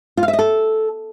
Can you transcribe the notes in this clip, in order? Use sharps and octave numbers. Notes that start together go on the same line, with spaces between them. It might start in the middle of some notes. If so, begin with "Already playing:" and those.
F4
F5
E5
D#5
A4